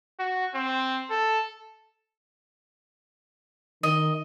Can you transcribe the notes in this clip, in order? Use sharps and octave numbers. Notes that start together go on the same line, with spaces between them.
F#4
C4
A4
D#3 D#5